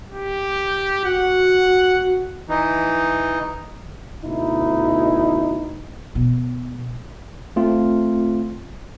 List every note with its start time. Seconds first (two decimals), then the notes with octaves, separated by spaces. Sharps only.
0.11 G4
1.05 F#4 F#5
2.49 E3 D#4
4.23 D2 B2 D#4 E4
6.15 B2
7.56 A3 C4 F4